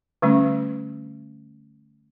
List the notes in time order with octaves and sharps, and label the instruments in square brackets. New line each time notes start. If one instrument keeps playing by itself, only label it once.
[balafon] D3 G3 A3 C#4